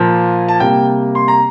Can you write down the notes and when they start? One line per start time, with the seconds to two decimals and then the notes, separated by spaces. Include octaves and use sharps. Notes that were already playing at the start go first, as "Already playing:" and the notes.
Already playing: A#2 F3 A#3
0.48 A5
0.60 C3 G3 A#3 G5
1.15 C6
1.28 A#5